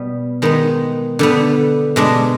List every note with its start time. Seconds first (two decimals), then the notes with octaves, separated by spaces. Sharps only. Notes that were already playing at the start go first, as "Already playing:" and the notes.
Already playing: B2 G3 B3
0.42 D#3 G#3 B3 D#4
1.19 D3 G3 B3
1.96 B2 G#3 D4